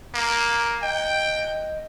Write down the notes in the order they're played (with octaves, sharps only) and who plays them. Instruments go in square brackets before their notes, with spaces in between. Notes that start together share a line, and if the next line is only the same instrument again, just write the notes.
[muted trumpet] A#3
[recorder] D#5 [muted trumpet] G5